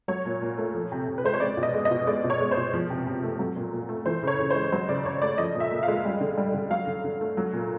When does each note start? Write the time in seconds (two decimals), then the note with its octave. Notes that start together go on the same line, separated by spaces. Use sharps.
0.08 F#3 C#5
0.25 A#2
0.42 A#2
0.58 A3
0.75 F3
0.92 C3
1.08 C3
1.18 B4
1.24 G#3 C5
1.34 C#5
1.40 G#3 D5
1.57 B2
1.63 D#5
1.74 G#3
1.85 D#5
1.91 B2
2.07 G#3 D5
2.24 B2
2.30 C#5
2.40 G#3
2.51 C5
2.57 B2
2.73 F3
2.90 C3
3.07 C3
3.23 A3
3.39 F#3
3.56 A#2
3.73 A#2
3.89 A3
4.06 E3 C5
4.23 C#3 C#5
4.39 C#3
4.51 G#3 C5
4.72 F#3 C5
4.89 C#3 D5
5.05 C#3 C#5
5.22 A3 D5
5.38 F3 D#5
5.54 A#2
5.60 E5
5.71 A#2
5.83 F5
5.88 G#3
6.05 G3
6.21 D3
6.37 G3
6.54 D3
6.70 F#3 F5
6.87 D3
7.04 D3
7.21 A3
7.37 F#3
7.53 A#2